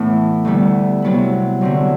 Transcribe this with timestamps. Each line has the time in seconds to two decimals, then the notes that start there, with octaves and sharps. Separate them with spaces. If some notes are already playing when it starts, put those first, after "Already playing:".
Already playing: A2 E3 A3 B3 E4
0.45 D2 D3 G3 B3 E4
1.02 C3 F#3 B3 E4
1.61 D3 F#3 C4 E4